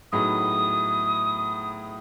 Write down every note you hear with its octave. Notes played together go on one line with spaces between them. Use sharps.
A2 F#3 B3 D#4 G#4 D#6